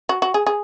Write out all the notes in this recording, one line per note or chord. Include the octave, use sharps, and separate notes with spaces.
F#4
F#4
G#4
G#4